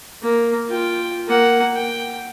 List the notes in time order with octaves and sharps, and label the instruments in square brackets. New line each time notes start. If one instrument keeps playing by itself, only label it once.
[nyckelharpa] A#3
F4 G5
A#3 F#5
G5